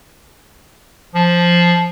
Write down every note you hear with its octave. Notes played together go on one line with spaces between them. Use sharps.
F3